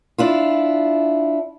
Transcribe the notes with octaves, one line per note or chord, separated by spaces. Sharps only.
D4 E4 F4